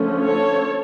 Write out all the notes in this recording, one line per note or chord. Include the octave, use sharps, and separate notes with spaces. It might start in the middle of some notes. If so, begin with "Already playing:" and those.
Already playing: D3 F3 A3 C#4
A4 C#5